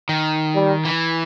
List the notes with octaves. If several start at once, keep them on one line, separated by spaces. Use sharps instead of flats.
D#3
G3
E3